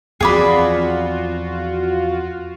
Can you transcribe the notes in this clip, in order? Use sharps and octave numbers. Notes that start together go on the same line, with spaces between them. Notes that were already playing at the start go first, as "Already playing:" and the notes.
E2 F3 C4 F4 F#4 G#4 D5 B5